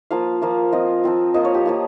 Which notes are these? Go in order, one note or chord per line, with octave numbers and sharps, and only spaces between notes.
F3 A#3 F4 F5
F3 A#3 F4
F3 C4 F4 D#5
F3 C4 F4
F3 A#3 F4 D#5
C#5
G4
F3 A#3 F4